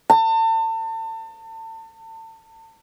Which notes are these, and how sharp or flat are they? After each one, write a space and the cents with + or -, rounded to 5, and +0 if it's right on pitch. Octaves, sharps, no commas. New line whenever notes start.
A5 +35